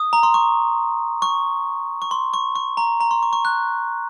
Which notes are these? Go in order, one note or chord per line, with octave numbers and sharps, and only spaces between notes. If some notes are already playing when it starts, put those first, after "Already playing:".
Already playing: D#6
A#5
C6
C#6
C#6
C#6
C6
C#6
C#6
A#5
A#5
C6
C#6
C#6
F#6